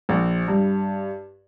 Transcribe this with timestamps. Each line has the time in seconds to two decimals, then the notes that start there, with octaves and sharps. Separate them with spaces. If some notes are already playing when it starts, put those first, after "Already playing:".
0.09 A#1
0.48 G2